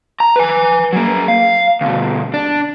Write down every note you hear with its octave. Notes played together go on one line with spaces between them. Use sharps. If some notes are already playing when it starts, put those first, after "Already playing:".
A#5
B4 G#5
F#3 A#3
F5
D2 B2
D4